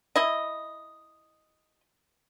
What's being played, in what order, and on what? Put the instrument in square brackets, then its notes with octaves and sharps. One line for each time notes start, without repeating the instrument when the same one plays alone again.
[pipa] E4 D#5